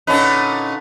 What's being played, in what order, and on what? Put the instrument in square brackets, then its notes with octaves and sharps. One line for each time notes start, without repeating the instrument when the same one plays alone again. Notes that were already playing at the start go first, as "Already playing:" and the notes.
[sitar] A#2 C#4 D#4 [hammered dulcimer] D3 B4